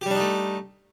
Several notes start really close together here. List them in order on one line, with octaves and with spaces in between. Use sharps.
G4 G3 D4 D#4 A3